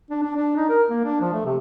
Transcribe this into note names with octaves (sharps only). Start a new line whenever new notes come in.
D4
D4
D4
D#4
A#4
A#3
D4
F3
A3
C3